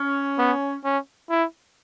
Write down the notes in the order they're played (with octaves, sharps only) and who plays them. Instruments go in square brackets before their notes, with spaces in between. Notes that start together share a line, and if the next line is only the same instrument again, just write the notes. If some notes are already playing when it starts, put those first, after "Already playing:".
Already playing: [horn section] C#4
[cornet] B3
C#4
E4